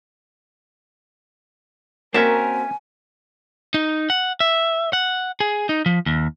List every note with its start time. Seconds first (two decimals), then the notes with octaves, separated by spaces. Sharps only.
2.14 A#3 C4 C#4 F#4 A#4 E5 G#5 A5
3.74 D#4
4.10 F#5
4.40 E5
4.93 F#5
5.40 G#4
5.69 D#4
5.86 F3
6.06 D#2